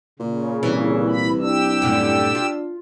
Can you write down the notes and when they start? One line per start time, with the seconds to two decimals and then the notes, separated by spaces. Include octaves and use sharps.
0.19 A#2 C#3
0.63 C2 A#2 E3
1.09 B5
1.41 D4 G4 E6
1.82 F#2 A2 D3
2.35 F4